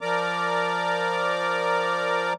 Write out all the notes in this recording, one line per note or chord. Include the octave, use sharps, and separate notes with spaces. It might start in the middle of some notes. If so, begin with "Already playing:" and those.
F3 A#4 D5 A#5 D6